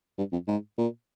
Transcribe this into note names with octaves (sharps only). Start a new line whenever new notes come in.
G2
F2
G#2
A#2